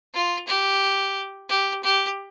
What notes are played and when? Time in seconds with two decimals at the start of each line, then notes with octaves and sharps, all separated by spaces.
0.14 F4
0.47 G4
1.49 G4
1.83 G4